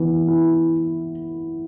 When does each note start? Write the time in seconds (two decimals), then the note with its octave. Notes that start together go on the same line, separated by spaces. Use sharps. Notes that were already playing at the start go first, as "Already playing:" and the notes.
Already playing: E3 B3
0.28 E4